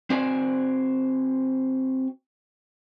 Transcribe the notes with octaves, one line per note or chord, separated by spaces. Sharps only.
C4 F#4 C5 D5 G#5